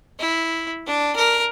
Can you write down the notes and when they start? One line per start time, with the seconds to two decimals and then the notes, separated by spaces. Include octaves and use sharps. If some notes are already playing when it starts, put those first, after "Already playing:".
0.19 E4
0.87 D4
1.16 A#4